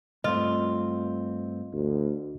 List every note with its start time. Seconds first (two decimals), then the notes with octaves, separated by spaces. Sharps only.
0.24 G2 A3 C4 F4 D#5
1.73 D2